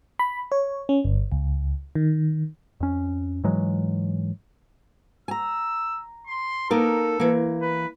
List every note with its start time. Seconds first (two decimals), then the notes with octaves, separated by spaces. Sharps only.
0.19 B5
0.52 C#5
0.89 C#4
1.04 G1
1.32 C#2
1.95 D#3
2.80 F2 C#4
3.44 G#2 E3 F#3 G#3
5.28 G#5 A#5 E6
6.27 C6
6.71 A#3 D#4 A4 A#4
7.20 E3 A#3
7.61 B4